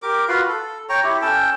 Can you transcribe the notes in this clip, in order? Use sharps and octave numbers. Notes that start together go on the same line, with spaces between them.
G4 A#4 D6
F4 F#4 B4 F5
A4
C#5 G5 A#5 C#6
E4 G4
C#4 A4 G5 A5